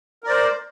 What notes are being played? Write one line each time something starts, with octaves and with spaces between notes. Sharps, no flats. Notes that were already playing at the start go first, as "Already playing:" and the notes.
A#4 C5 D5